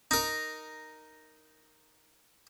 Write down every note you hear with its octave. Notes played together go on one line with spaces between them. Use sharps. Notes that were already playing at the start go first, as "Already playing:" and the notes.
D#4 A#4